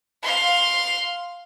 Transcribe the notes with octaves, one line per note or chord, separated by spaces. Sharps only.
F5 C6